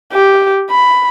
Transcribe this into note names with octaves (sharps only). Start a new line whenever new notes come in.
G4
B5